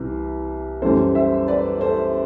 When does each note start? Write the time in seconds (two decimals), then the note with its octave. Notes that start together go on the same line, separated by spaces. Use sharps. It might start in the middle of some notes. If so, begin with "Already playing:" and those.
Already playing: C2 C3 E3 G3
0.82 F#2 E3 G3 A4 C5
1.15 C5 E5
1.48 B4 D5
1.81 A4 C5